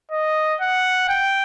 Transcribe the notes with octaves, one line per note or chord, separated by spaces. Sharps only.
D#5
F#5
G5